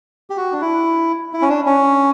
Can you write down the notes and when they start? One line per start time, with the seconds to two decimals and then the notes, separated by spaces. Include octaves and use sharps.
0.30 G4
0.37 F#4
0.52 D4
0.62 E4
1.33 E4
1.42 C#4
1.49 D4
1.66 C#4